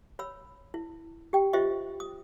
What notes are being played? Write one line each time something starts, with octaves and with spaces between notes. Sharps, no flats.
C#5 B5 E6
E4
G4 G5
F4 G4 C5 D#5 E5 C#6
D#6